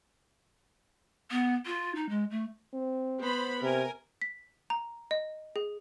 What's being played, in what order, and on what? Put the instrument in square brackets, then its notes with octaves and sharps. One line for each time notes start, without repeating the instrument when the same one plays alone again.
[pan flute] B3
F4
D#4
G#3
A3
[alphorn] C4
[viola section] B3 C5 B5
[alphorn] C3 [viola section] A#4 G#5
[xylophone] B6
A#5
D#5
G#4